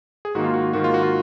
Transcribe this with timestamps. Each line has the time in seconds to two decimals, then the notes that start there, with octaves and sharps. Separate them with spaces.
0.25 G#4
0.35 G#2 D#3 A#3 F#4
0.44 F4
0.54 F#4
0.73 G#2 D#3 A#3 F#4
0.84 F4
0.94 F#4
1.03 F4